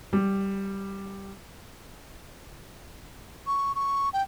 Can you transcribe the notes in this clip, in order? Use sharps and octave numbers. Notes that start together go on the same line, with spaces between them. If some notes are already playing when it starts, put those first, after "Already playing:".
G3
C#6
C#6
G5